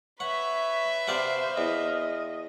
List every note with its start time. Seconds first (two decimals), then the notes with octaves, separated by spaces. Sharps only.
0.20 B4 C#5 E5 F#5
1.08 C3 C5 D5 F5 F#5
1.58 E2 D#5